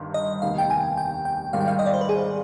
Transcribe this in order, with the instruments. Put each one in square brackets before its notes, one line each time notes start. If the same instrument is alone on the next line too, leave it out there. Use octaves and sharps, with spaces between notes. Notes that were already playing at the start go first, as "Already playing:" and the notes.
Already playing: [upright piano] G1 G2 D#3
[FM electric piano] D#5
[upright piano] F1 D#2 D#3 B3 [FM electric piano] F5
[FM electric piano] G5
G#5
G5
G5
[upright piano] G#1 G#2 D#3 G3 [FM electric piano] F5
[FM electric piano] G5
F5
D#5
D5
C5
B4
G#4